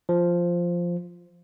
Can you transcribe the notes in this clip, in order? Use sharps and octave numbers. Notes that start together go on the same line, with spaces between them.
F3